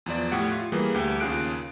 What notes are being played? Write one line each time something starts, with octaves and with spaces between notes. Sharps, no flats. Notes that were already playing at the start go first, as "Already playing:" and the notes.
E2 F3 D5
A2 A3 G4 F#5
F4
E3 G3 A#3 G#4
D2 G4
D#2 C#3 F4 G#4 F#6 D7